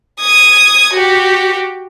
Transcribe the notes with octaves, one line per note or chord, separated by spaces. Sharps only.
D#6 G#6
F#4 G4